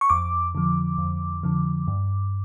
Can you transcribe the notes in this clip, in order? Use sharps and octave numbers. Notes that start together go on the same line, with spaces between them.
C#6
F2 D6
D3 F3
F2
D3 F3
G2